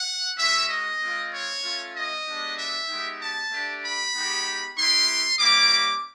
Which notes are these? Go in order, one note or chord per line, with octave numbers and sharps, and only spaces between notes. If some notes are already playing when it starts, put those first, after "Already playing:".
Already playing: F#5
G#3 C#4 F#4 E5
D#5
G#3 C4 F4
C#5
A3 C#4 F4
D#5
G#3 B3 D4 G4
E5
G#3 B3 D#4 G4
A5
A3 D4 G4
B5
G#3 B3 D#4 G4
B3 E4 G4 C6
G3 A#3 C#4 E4 G4 D6